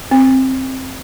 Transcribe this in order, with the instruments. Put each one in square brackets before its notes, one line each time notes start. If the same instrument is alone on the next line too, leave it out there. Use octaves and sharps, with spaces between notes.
[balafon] C4